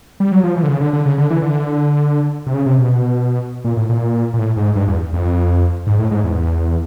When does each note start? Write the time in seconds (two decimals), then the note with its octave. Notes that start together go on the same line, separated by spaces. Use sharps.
0.20 G3
0.32 F#3
0.44 F3
0.57 E3
0.63 D3
0.68 C#3
0.81 D3
0.93 D3
1.06 C#3
1.18 D3
1.30 E3
1.42 D3
2.46 C3
2.54 C#3
2.66 C3
2.78 B2
3.65 A#2
3.77 A2
3.89 A#2
4.34 A#2
4.38 A2
4.57 G#2
4.75 G2
4.88 E2
5.13 F2
5.87 G#2
5.99 A2
6.11 G#2
6.24 E2